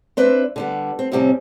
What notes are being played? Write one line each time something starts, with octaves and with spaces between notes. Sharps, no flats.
C4 D4 B4 E5
D3 G3 B3
C4
F2 A2 C3 G3 C4 C#4